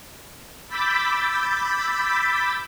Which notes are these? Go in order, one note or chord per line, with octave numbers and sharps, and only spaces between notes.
B5 D6 E6 G6 A6 B6